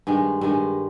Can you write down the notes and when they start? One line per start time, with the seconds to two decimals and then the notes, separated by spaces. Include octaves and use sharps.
0.07 G2 D#3 G#3
0.41 G2 D#3 G#3